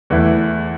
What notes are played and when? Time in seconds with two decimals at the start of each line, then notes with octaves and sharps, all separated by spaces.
0.10 E2 E3 A3 E4